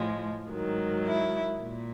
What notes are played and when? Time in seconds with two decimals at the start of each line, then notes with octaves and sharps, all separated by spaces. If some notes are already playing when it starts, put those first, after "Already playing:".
Already playing: A2 F3 G#3
0.50 G#2 D#3 F#3
1.06 E4
1.61 A#2